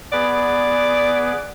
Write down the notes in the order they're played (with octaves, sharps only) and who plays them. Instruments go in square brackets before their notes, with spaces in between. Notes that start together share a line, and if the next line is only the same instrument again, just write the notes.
[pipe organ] B3 G#4 B4 [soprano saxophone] D5